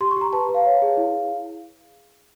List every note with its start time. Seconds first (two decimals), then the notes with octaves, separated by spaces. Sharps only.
0.01 G4 C6
0.11 C#6
0.17 G4 A#5
0.33 B4 A5
0.49 B4
0.54 F5
0.65 C#5
0.82 G#4
0.97 E4